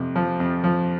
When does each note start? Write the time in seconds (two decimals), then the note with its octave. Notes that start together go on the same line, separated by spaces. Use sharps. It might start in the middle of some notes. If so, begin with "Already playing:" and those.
Already playing: F2 C3
0.16 F3
0.40 F2
0.64 F3